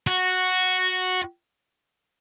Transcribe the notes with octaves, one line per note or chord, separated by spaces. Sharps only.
F#4